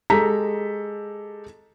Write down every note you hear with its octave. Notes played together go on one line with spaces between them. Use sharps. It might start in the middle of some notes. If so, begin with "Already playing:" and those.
G#3 G4 A4 A#5 B6